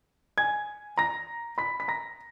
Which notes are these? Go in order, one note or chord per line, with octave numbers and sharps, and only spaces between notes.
G#5 G#6
A#5 A#6
B5 B6
B6
A#5 A#6